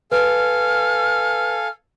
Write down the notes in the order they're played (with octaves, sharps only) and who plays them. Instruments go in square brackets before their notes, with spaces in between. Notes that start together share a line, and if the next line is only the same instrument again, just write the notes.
[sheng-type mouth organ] A4 F5 G#5 [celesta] B4 [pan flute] F6